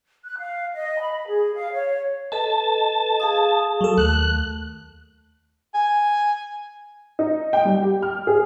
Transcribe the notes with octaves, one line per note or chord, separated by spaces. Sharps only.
F#6
F5
D#5
B5
G#4
F5
C#5
A4 B4 D#5 A5
G#4 F5 D#6
F#3 A4
D#2 A3 F#6
G#5
D#4
G5
G3
G4
F6
G#4